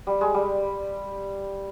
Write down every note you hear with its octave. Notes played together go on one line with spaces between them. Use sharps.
G3
G#3
G3